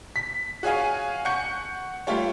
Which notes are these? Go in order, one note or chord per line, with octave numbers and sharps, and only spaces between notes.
B6
F#4 G#4 C#5 F5 G#5
F#5 C#6 G6 C#7
G3 A3 F4 G4 C#5